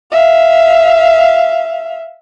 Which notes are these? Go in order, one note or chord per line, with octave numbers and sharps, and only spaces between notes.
E5 F5